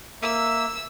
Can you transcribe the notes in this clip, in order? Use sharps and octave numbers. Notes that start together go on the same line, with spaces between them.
A#3 E5 E6